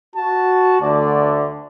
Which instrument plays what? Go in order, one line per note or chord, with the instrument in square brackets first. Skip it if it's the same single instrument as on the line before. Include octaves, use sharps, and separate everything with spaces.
[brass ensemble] F#4 [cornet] A5
[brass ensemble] D2 D3 [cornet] D5